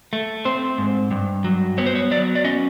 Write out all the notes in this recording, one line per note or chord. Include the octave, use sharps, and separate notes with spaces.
A3
C4 C5
G#2
G2
F#3
B3 C#5
C5
C#5
F#3 D5
D5
C#4 D#5